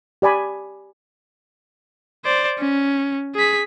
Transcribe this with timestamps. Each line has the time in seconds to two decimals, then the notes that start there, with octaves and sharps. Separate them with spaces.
0.22 G4 D5 G#5 B5
2.25 C5 D5
2.59 C#4
3.35 G#4 B6